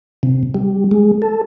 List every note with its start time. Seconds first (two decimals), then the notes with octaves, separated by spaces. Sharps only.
0.23 C3
0.55 G3
0.91 G#3
1.22 A4